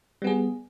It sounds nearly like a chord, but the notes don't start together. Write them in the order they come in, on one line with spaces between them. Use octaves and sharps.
G3 B3 G#4